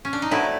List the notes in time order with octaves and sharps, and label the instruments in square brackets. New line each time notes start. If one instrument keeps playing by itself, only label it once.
[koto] C#4
D4
D#4
[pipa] D3 F#3 A3 C4 [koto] E4